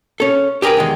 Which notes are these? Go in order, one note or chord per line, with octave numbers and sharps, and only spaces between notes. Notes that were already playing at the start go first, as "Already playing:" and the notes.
C#4 A4
G4 G#4 A#4 B4 G5
E2 D#3 G#3